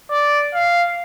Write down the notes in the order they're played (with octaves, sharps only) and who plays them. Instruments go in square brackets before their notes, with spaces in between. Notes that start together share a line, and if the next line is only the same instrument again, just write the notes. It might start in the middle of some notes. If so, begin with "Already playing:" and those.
[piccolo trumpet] D5
F5